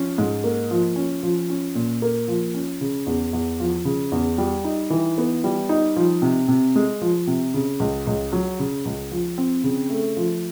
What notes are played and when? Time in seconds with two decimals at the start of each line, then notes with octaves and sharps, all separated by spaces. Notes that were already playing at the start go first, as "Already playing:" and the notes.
Already playing: F3 C#4
0.18 G#2
0.44 A#3
0.71 F3
0.96 C#4
1.23 F3
1.50 C#4
1.75 A#2
2.02 A#3
2.28 F3
2.55 C#4
2.81 C#3
3.07 E2
3.33 E2
3.60 F3
3.85 C#3
4.12 E2
4.38 G3
4.64 D#4
4.90 E3
5.18 B3
5.44 G3
5.69 D#4
5.96 F3
6.22 C3
6.48 C3
6.76 G#3
7.02 F3
7.27 C3
7.54 C#3
7.80 C#2
8.07 C#2
8.33 F#3
8.59 C#3
8.85 C#2
9.11 F3
9.38 C4
9.64 C#3
9.90 A3
10.17 F3